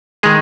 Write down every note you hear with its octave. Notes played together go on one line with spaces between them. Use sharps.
D#3 G#3 G#4